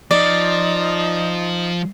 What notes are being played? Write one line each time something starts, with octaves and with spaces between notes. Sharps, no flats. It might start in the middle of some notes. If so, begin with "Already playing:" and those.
F3 D#4 D5